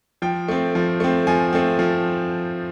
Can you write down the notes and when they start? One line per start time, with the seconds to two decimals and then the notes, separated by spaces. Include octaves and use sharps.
0.22 F3 G5
0.48 A3 C4
0.75 F3
1.00 A3 C4
1.27 F3 G#5
1.53 A3 C4
1.79 F3